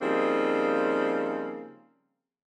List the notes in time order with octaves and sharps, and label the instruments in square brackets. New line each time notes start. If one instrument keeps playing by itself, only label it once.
[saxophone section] C#3 F3 G3 A#3 C4 D#4